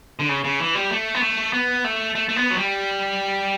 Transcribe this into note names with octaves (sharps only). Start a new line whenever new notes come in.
D3
C#3
C#3
E3
G3
A3
B3
A3
B3
A3
A3
A3
B3
F#3
G3